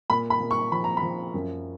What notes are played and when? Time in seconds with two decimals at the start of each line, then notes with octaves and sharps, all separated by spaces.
0.10 A#2 B5
0.30 B5
0.40 A#2
0.51 C#6
0.72 F3 B5
0.84 A#5
0.97 B5
1.03 F3
1.34 F#2